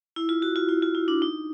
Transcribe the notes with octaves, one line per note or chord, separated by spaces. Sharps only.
E4
F4
F#4
F4
E4
F4
E4
D4
D#4